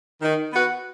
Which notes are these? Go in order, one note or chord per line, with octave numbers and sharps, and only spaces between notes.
D#3
B3 F#4 B4